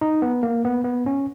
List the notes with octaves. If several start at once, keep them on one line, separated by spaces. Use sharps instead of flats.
D#4
B3
A#3
B3
B3
C#4